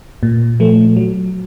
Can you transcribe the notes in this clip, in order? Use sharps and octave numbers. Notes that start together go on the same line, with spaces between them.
A#2
F3 A3
F#3